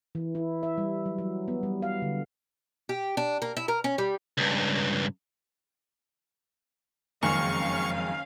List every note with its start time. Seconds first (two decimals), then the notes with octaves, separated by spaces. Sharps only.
0.15 E3
0.35 E4
0.63 E5
0.78 G3
1.06 F#3
1.18 F#3
1.48 B3
1.63 G3
1.82 F5
2.02 D3
2.89 G4
3.17 D4
3.42 A#3
3.57 E4
3.68 A#4
3.84 C#4
3.98 G3
4.38 C#2 G2
7.23 F#1 F2 D#3 G#3 C#4 F5 G#5 C#6